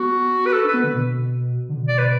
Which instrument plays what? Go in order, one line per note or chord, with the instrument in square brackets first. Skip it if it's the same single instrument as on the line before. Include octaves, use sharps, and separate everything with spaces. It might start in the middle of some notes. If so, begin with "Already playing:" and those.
Already playing: [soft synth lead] B3 [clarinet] F#4
[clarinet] B4
A4
[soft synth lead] D4
[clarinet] B4
[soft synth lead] B3
[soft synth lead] D3 [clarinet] B4
[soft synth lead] B2
D3
B2
[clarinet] D5
B4